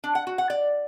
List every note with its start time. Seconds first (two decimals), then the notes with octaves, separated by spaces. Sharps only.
0.04 D4
0.15 F#5
0.27 F#4
0.38 F#5
0.50 D5